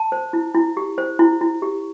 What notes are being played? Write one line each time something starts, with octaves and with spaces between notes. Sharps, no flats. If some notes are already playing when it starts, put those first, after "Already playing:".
Already playing: A5
C5
E4
E4
G4
C5
E4
E4
G4